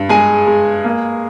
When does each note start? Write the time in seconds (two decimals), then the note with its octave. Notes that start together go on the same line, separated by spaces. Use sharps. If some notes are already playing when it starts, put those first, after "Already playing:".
Already playing: G2
0.09 G#3 G#4 G#5
0.47 G#3
0.84 A#3